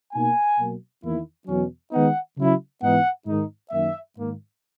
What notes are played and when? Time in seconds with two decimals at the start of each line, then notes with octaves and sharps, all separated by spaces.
0.14 B2 A#3 D#4 G#5
0.58 B2 F#3 A#3
1.02 E2 D#3 A#3 E4
1.48 E2 B2 F#3 C#4
1.92 D#3 G#3 B3 D#4 F#5
2.38 C#3 F#3 C#4 E4
2.82 G#2 E3 B3 D#4 F#5
3.26 G#2 D#3 G#3 D#4
3.71 F#2 D#3 A#3 E5
4.16 G#2 D#3 A#3